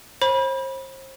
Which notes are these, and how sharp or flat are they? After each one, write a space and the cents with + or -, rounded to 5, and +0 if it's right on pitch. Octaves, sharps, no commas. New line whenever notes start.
C5 +40 B5 -25